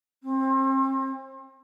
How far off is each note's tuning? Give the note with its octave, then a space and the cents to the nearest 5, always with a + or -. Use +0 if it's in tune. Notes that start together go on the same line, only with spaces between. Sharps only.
C4 +35